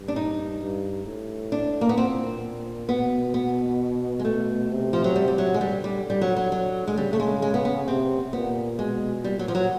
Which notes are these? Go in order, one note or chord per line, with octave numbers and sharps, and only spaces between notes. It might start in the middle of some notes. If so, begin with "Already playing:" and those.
Already playing: G2
D4
D#4
G2
A2
D4
A#3
B3
A#2 C4
B2 B3
B3
G#3
A3
C3
F3
F#3
G3
G3
F#3
G#3
D3 G3
G3
G3
F#3
F#3
F#3
G#3
C#3 G3
A3
G#3
G#3
B3
B3
C3 C4
A#2 B3
B2 G#3
A#2 G3
F#3
F3
F#3